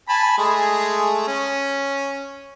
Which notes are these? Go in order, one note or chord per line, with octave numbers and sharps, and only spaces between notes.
G#5 A5 B5
G#3 A3 G#4
C#4